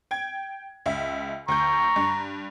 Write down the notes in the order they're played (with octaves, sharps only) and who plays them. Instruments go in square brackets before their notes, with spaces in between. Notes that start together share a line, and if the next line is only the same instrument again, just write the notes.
[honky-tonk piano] G5 G#6
C#2 E5
[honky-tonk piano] D2 G6 [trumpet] A#5 [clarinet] C#6
[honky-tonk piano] G2